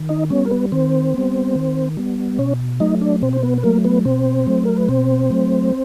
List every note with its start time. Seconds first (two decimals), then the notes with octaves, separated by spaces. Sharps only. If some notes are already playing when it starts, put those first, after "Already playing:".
Already playing: D#3
0.09 D#4 D#5
0.30 G3 B3 C#4 C#5
0.45 A#4
0.51 B3 B4
0.72 D#3 C4 C5
1.14 G3 B3
1.55 D#3
1.97 G3 B3
2.39 B2 C#4 C#5
2.80 F#3 A3 D#4 D#5
3.01 D4 D5
3.22 B2 C4 C5
3.33 C5
3.43 B3 B4
3.58 B4
3.63 F#3 A3 A#3 A#4
3.84 B3 B4
4.05 B2 C4 C5
4.47 F#3 A3
4.65 A#4
4.77 B4
4.88 B2 C4 C5
5.30 F#3 A3